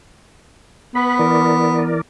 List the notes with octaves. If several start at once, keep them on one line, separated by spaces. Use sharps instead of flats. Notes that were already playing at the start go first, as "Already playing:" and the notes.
B3 B4 B5
E3 A#4 D5